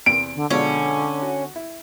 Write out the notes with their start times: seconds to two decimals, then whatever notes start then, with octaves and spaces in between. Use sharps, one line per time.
0.06 E2 C3 D7
0.35 D3
0.50 B2 D3 F3 G#3 C#4
1.22 F#4
1.56 E4